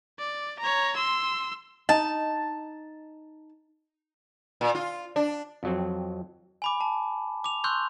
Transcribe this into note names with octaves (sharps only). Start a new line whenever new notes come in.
D5
C#5 A#5
C6 E6
D#4 A5
A#2
F4
D4
F2 F#3 C4
G#5 B5 D6
A5
D6 F7
C6 C#6 E6 F#6 G6